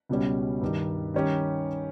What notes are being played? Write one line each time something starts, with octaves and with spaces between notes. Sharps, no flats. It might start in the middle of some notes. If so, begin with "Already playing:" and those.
C#2 B2 G3 C#4
G2 D#3 G3
D#3 G3 C#4 G4